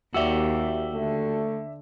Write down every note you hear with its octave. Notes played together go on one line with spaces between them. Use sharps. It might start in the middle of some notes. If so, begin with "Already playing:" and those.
D#2 F#4 G4 D5 E5 E6
D3 A3